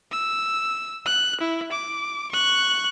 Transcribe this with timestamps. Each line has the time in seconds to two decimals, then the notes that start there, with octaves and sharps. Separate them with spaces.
0.11 E6
1.06 F#6
1.40 E4
1.72 D6
2.31 C#6 F#6